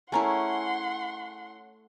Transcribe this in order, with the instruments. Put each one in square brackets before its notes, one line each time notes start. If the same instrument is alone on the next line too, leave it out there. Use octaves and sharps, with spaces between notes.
[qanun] A3 C#4 E4 [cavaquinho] G#4 A#4 [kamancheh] F#5 C6